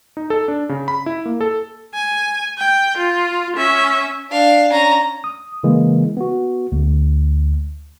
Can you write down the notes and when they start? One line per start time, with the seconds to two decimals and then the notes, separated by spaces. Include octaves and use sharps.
0.17 D#4
0.30 A4
0.48 D4
0.69 C#3
0.88 B5
1.06 E4
1.26 A#3
1.41 A4
1.95 G#5
2.58 G5
2.98 F4
3.56 C#4 E5
4.30 D4 F5
4.71 C#4 A#5
5.24 D#6
5.64 C#3 E3 G#3 A#3
6.17 B3 F#4
6.72 D2